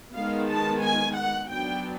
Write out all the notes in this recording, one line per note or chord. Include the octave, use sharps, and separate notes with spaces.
D#3 G#3 B3 F5
A5
G#5
F#5
F#3 B3 D4 G5